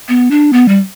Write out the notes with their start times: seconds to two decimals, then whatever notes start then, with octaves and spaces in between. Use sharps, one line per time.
0.09 B3
0.31 D4
0.53 B3
0.68 G3